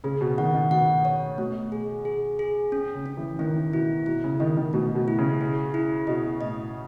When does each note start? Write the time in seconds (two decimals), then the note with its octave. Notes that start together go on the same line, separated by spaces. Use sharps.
0.04 C#3 G#4
0.21 B2
0.38 D#3 F#5
0.54 D#3
0.71 B2 F#5
1.05 C#5
1.38 B2 A3
1.72 G#4
2.05 G#4
2.39 G#4
2.72 C#4
2.94 C#3
3.06 C#4
3.17 E3
3.39 D#3 E4
3.73 B2 E4
4.06 B2 E4
4.24 C#3
4.40 D#3 D#5
4.57 D#3
4.73 B2 A3
4.95 B2
5.08 E4
5.18 C#3
5.41 G#4
5.74 E4
6.07 B2 D#5
6.41 A2 D#5